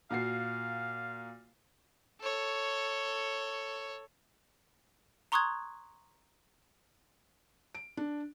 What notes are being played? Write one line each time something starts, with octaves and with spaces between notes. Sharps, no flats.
A#2 F#4 F5 C7
A4 C#5
A#5 C6 C#6 D#6 F#6 G#6
D7
D4